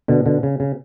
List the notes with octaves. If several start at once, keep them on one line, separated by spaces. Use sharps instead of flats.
B2 D3
B2 D3
C#3
C#3